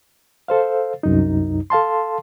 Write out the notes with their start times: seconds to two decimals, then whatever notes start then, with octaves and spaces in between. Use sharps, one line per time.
0.48 A4 C5 F5
1.03 C2 F#2 D#4
1.70 A4 F5 A5 C6